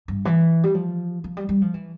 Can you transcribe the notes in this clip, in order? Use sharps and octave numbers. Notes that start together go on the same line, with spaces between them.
G2
E3
G3
F3
F3
G3
G3
F3
E3